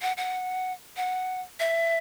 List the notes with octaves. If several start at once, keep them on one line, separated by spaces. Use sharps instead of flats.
F#5
F#5
F#5
E5